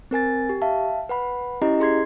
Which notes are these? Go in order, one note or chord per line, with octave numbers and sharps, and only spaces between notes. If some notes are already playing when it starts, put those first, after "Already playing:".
C4 A#4 G#5 A6
G4
E5 F5 A5
B4 F#5 B5
C#4 E4 G4 D#5 A#5
G#4 C6 G#6 C7